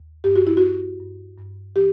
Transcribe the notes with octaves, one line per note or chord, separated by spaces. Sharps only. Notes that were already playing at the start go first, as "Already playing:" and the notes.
Already playing: D#2
G2 G4
F#4
E4
F#4
G2
G2
G2
E3 G4